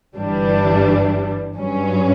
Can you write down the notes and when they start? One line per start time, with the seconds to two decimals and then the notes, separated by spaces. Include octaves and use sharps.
0.16 G1 G2 E3 G3 D4
1.56 G2 F#3 C#4